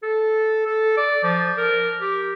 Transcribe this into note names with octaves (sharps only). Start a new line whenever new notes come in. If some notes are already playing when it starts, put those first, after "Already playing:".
A4
A4
D5
F3
A#4
G4